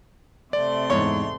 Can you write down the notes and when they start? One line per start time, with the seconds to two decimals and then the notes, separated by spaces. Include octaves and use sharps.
0.53 C3 A3 D5 C6
0.90 E2 G#2 C#5